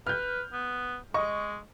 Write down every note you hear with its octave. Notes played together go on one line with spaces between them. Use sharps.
B4 F6 G6
B3
G#3 D#5 C#6